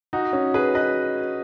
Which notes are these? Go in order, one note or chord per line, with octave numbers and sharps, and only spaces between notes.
D#4 F#4
C#4
G#4 B4
B4 D#5